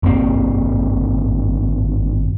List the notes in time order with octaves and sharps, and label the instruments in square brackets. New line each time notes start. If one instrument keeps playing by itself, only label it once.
[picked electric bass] G#1 G2 A#3 C4